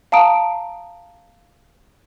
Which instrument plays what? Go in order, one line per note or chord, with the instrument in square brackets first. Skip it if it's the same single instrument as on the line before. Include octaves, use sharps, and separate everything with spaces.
[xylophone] F5 A5 A#5 D#6 D7